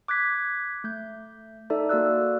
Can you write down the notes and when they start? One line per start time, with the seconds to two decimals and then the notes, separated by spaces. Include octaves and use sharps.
0.08 D6 F#6 G#6 B6
0.84 A3 G6
1.70 D#4 A4 D5 E5
1.89 A#3 F#4 D5 E6 F#6